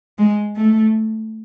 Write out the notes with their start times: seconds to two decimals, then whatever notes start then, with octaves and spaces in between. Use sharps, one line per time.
0.18 G#3
0.56 A3